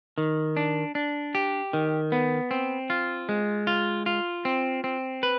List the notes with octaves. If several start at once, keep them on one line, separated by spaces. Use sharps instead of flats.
D#3
D4
D4
G4
D#3
B3
C4
F4
G#3
F4
F4
C4
C4
B4